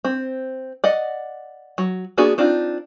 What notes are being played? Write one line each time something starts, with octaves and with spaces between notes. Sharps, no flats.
C4
D5 D#5 F#5
F#3
A#3 B3 D4 F#4 G#4
C4 D4 D#4 F4